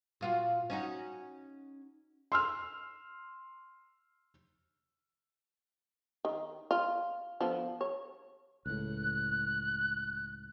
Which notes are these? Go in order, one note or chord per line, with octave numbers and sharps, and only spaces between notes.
A#2 F4 F#4
C#4 D#4 F#4
C6 E6 F6
D#3
F4
D3 F3 B3
C#5
C#2 A2 F#6